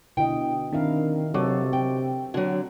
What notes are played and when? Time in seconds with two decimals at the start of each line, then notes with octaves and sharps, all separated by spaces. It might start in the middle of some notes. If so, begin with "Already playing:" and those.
0.17 B2 D3 E4 D#5 G5
0.73 D#3 C4 D4 E4 A#4 F5
1.34 C3 F#3 A4 D#5 C#6 D6
1.73 C4 G5
2.34 D3 F#3 F#4